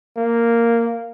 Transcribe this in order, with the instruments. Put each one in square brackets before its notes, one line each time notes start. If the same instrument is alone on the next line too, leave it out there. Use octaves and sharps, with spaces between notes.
[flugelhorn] A#3